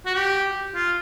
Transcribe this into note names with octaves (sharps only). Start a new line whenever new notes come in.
F#4
G4
F4